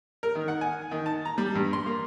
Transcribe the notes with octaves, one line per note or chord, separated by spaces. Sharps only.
A#4
D#3
F#5
G#5
D#3
A5
A#5
G3
G2
C6
A#3